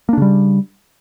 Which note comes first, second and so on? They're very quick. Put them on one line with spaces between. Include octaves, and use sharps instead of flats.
A#3 D4 C#3 G3